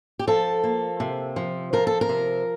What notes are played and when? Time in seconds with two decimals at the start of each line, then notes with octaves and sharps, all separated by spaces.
0.19 G4
0.27 F3 A4
0.64 A#3
1.00 C3
1.36 F3
1.73 F3 A#4
1.87 A4
2.01 A#4
2.09 C3